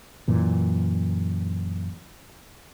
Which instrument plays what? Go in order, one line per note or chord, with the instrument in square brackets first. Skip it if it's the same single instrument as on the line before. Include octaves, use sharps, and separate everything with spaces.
[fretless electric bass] F#2 A#2 E3